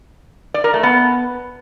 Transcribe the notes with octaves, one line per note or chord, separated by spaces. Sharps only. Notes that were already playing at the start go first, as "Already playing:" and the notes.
D5
A#4
A3
B3